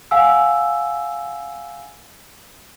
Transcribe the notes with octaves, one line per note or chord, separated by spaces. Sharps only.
F5 F#5 G#5 E6